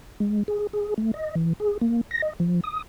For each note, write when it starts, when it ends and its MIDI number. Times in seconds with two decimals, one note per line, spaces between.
0.20 0.43 56
0.48 0.67 68
0.73 0.94 68
0.98 1.11 57
1.14 1.35 75
1.35 1.53 52
1.60 1.78 68
1.81 2.01 58
2.11 2.22 94
2.22 2.33 75
2.40 2.60 53
2.64 2.82 87